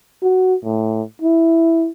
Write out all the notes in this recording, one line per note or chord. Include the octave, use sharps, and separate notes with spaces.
F#4
A2
E4